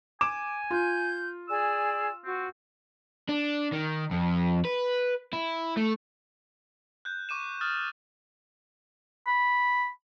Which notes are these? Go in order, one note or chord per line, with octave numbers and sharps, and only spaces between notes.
G#5 D6 E7
F4 G6
G#4 D5 G#5 E6
C4 F#4
D4
D#3
F2
B4
E4
A3
F#6 G6
C#6 D6 D#7 E7
D#6 F6 F#6 A6
B5